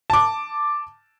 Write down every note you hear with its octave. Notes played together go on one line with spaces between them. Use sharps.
A5 D6